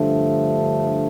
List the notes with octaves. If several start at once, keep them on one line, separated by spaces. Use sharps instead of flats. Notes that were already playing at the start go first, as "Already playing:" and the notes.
Already playing: G2 D3 F3 A3